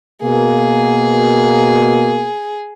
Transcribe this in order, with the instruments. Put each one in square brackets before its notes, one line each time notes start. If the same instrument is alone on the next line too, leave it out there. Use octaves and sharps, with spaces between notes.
[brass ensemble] B2 A#3 [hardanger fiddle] G#4